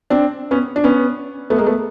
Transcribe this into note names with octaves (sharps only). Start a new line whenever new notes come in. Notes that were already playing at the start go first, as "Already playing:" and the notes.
C4 D4
B3 C#4
D4
B3 C#4
A3 B3
G#3 A#3
A3 B3